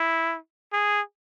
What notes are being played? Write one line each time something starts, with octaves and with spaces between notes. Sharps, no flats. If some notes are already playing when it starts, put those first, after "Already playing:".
Already playing: E4
G#4